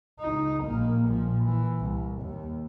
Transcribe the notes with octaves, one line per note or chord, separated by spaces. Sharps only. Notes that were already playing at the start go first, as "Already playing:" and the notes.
C#2 D#4
A#1 A#3
A#2 F3
E3
C2
D#2